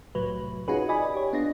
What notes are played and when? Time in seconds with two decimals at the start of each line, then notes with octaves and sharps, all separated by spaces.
0.15 C2 A2 F#3 B4
0.68 C#4 D#4 F4 F#4 G#4 B4
0.89 D5 D#5 G#5 B5
1.14 G4 C#5
1.33 B3 D4 F4 D#5 A#6